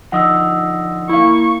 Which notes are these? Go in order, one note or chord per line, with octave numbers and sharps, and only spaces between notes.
D3 F3 D#4 F#5 D#6 E6
A#3 E4 C#6